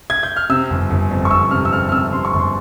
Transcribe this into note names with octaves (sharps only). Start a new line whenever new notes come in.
G#6
G6
F6
C3 E6
G1
G1
F2
C#6
G1 E6
C3 F6
E6
F2 F6
F6
C3 E6
C3 C6
C#6
G1
C6